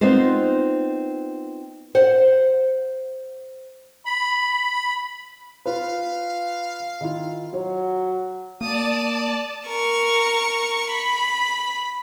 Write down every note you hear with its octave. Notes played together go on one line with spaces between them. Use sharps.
B3 C4 D#4 F4 C5
C5 F#5
B5
F4 B4 F5
D#3 E4 F4
F#3 C#5
A#3 D5 A5 D#6
A#4 C#6
B5